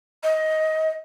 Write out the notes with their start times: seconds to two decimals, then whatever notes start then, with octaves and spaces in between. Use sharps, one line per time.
0.23 D#5